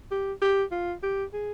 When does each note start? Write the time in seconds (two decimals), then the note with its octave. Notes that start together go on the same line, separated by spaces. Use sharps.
0.11 G4
0.42 G4
0.72 F4
1.03 G4
1.33 G#4